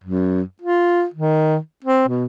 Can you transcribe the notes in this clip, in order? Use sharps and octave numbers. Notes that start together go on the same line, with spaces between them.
F#2
F4
D#3
C4
B2